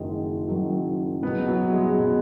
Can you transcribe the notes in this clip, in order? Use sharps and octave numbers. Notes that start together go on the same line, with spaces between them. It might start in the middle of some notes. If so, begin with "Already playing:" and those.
Already playing: F#1 F#2 D#3 F#3 G#3
F#1 F#2 D#3 F#3
C#2 B2 F#3 B3
F#3
G#3
B2 F#3